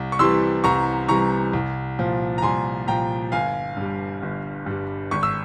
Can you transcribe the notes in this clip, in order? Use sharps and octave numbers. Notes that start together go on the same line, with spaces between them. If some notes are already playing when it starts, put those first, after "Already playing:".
Already playing: C2
C#6
C3 E3 G3 C6 E6
C2 A#5 C#6
C3 E3 G3 A#5 C#6
C2
A#2 F3
A#5
C2 G#5 C6
A#2 F3 G5 A#5
G1 F5 G#5
G2 G3
G1
G2 G3
G#1 C#6
E6